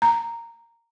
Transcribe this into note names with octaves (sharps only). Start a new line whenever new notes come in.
A#5